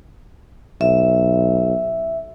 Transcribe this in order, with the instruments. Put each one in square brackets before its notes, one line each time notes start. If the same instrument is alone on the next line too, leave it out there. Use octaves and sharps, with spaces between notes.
[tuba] B1 [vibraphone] E5